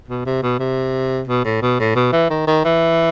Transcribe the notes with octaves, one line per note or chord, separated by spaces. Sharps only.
B2
C3
B2
C3
B2
A2
B2
A2
B2
E3
D#3
D#3
E3